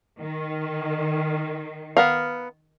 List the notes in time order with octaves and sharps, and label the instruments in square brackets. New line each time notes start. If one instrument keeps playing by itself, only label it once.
[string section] D#3
[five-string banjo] B3 A#4 F5